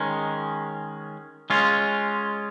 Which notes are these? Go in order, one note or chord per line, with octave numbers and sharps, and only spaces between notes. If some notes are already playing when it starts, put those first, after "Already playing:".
Already playing: D#3 G#3 C#4
G#3 C#4 F4